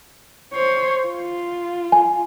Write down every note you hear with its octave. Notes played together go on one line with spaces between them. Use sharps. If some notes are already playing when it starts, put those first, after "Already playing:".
C5 C#5
F4
G#5